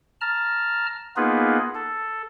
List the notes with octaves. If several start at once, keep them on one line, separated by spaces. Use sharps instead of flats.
A5 A#5 F6
A#3 B3 D#4 F4 G#4 B4
A4